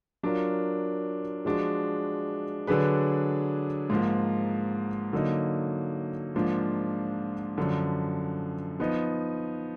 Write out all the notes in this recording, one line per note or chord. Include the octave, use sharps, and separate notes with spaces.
F#3 D4 F4 A#4
F3 G#3 D4 F#4
D3 F#3 D4 G#4 B4
G#2 F3 A#3
D3 F#3 A#3 D#4
G#2 F3 A#3 D4 F4
F#2 D3 F3
F3 B3 D#4